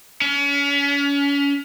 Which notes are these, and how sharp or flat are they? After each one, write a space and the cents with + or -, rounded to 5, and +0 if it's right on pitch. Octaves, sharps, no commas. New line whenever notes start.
C#4 +35